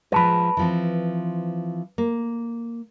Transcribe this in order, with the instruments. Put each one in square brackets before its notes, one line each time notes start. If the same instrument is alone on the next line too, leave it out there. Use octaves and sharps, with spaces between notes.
[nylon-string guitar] F3 G#3 [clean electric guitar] B4 A5 B5
[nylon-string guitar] E3 F3 C4
A#3